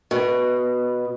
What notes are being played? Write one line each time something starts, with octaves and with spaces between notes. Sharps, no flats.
B2